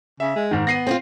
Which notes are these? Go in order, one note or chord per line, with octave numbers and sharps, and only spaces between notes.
C#3 E5
G#3
G#2 D#3
B3 A#6 C7 D#7
C4 E4 F4